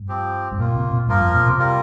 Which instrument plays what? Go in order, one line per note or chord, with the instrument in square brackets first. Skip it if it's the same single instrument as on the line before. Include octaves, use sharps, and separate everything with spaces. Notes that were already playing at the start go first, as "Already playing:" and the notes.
Already playing: [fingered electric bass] G2
[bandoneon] F3 C4 G4
[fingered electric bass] G2
[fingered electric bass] A#2 [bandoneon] D#3 A#3 F4
[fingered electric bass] C3
A#2
[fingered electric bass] G2 [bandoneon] F3 A#3 F4 A#4
[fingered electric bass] F2
A#2
C3
[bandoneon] G3 A#3 F4 A#4